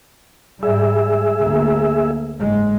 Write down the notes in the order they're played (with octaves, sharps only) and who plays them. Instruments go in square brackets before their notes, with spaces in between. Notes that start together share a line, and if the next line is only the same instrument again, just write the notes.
[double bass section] G#2 G3 [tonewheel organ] G#4 E5
[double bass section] D2 A3 A#3
F#1 G#2 G#3